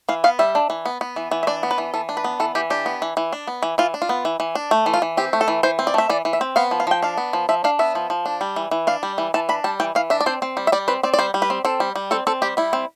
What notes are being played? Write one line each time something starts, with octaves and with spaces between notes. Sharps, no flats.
E3 F5
B3 F5
G3 E5
D4
E3
B3
B3
E3
E3
E5
D4 D5
B3
B4
E3
E3 A4
D4
B4
B3
E3 A4
E3 G4
D4 G4
B3
E3
E3
D4
B3
E3
E3 F4
D4
F4
B3
E3
E3
D4
A3
E3
F4
E3
C4 G4
A3
A4
E3
E3 C5
C4
D5
A3 E5
E3 D5
E3
E5
C4
B3 F5
F3
F5
F3 G5
D4 F5
B3
F3
F3 E5
D4 F5
B3 E5
F3
F3
D4
G3
E3
E3
D4 F5
G3
E3
E3 A5
D4 B5
G3 A5
E3 G5
E3 F5
D4 E5
D5
C4 C5
C4
G3
E5
G3 D5
C4 B4
C4 D5
D5
G3 C5
G3
B4
C4
C4 A4
G3
G3
C4 A4
C4 A4
G3 G4
G3 E4
C4